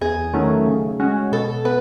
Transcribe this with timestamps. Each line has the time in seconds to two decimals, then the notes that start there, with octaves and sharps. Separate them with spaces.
0.01 E2 G#4
0.33 D#3 F#3 A3 C#4
0.67 C#3
1.00 G#3 C#4 F#4
1.32 B2 A4
1.65 B3 B4